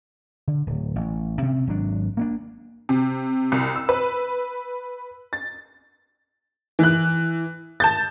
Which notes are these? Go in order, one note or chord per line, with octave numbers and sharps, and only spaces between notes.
D3
D1
A1
C3 C4 C#4
G#1 F#3 D4
A#3 C#4 D4
C3
C2
E6
B4
A6
E3 F#6
A5 G6 A6